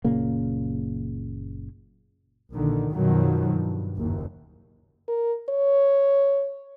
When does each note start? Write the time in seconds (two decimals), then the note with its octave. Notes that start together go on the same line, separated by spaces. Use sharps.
0.04 F#1 A#2 C#3 A#3
2.52 A#1 D3 D#3
2.93 F#2 B2 D#3 F3 F#3
3.53 G2
3.96 F#1 D#2
5.08 A#4
5.50 C#5